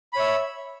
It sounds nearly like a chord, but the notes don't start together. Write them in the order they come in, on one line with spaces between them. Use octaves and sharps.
B5 C#5 E5